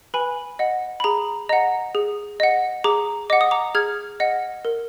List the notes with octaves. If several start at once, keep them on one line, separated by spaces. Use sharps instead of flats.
B4 G#5 B5
D#5 F#5
B5
G#4 A#5
D#5 F#5 A#5
G#4
D#5 F#5
G#4 A#5 D6
D#5 F#5 D6
D#6
A#5 D6
G#4 F6 G#6
D#5 F#5
A#4